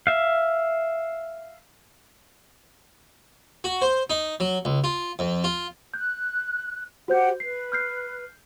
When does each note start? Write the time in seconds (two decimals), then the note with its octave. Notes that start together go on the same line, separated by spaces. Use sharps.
0.07 E5 F5
3.64 F#4
3.82 C5
4.10 D#4
4.40 F#3
4.65 C#2
4.84 F4
5.19 F2
5.44 F4
5.94 F#6 G6
7.08 F#4 G4 C5 F#5 G6
7.40 B4 C7
7.72 F6 G6 C7